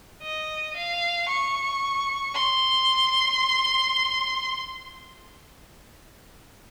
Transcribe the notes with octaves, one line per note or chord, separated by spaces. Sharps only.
D#5
F5
C#6
C6